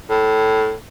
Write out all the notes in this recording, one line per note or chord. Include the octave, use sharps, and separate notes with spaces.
A2